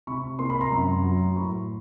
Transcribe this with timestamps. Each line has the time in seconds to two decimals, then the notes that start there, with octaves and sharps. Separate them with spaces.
0.07 C3 B5 C#6
0.39 A#3 C6
0.50 B5
0.61 A#5 C6
0.72 F#2
1.04 F#3
1.36 A2 B5 C#6